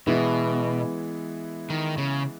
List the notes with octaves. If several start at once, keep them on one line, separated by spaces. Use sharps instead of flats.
B2 E3 G#3 B3 E4
D#3
C#3